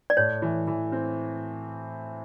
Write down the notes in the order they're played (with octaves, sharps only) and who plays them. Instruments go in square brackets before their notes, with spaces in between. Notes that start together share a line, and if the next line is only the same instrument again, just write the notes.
[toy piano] D5
[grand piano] A2 [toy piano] C#5
[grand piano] E3
E3
C4